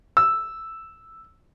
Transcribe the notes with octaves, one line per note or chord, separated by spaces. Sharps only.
E6